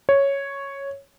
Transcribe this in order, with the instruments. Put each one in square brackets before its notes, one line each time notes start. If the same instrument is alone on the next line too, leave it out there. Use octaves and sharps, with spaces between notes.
[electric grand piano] C#5